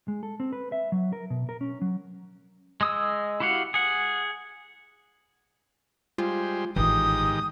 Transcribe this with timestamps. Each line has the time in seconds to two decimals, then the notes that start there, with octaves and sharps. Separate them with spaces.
0.08 G#3
0.23 A4
0.40 C4
0.53 B4
0.72 E5
0.92 F#3
1.13 A#4
1.30 B2
1.49 A#4
1.61 C#4
1.82 F#3
2.81 G#3 D#6 E6
3.40 E4 F#4 G4 F5 F#5
3.74 G#4 F#5
6.18 G3 G#3 F4 C5
6.76 A1 G#2 D#3 E3 F4 G4 D#6